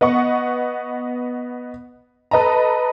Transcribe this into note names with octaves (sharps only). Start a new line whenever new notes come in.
B3 D#5 F#5 C#6
A4 B4 D#5 A5 A#5